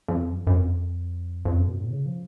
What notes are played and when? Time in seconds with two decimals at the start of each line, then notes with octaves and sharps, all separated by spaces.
0.08 F2
0.31 F#2
0.47 F#2
0.54 F2
1.45 F2
1.56 F#2
1.68 B2
1.80 A2
1.90 C#3
2.06 F3